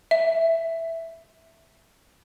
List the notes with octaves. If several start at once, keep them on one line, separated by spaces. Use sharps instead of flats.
E5